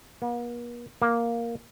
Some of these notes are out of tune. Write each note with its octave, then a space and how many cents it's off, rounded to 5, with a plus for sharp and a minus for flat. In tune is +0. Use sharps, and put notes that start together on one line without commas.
A#3 +45
A#3 +0